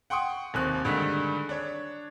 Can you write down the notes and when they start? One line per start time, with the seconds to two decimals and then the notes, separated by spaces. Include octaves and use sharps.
0.10 F#5 G5 C6 C#6 D#6
0.54 F1 D#2 C4 F#6
0.85 G2 D3 D#3 G#3 B6
1.49 D4 C#5